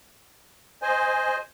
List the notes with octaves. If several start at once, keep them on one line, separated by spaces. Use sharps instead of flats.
C5 D#5 G#5